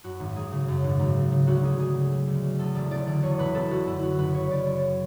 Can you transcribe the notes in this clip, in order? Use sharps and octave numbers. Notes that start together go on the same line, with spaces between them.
F#2 F#4
G#1
G#1 G#4
C#3
F#2
G#1
G#1
C#3
C#3
D2 F#4
D2 G#4
F#3 G#4
C#3
D2
D2
F#3
E2 A4
E1 D5
E1 D5
D3 D5
E2 C#5
E1 B4
E1 A4
D3 F#4
F#2 E4
F#3 E4 F#4
F#1 B4
C#3 C#5
F#2 D5
F#3 C#5